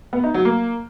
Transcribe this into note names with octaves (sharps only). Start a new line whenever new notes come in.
B3
D#4
F#3
A#3